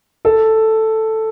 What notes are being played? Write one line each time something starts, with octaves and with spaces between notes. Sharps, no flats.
A4